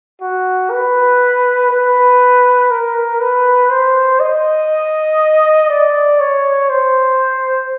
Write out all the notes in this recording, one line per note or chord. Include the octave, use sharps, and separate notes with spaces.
F#4
B4
B4
A#4
B4
C5
D#5
D5
C#5
C5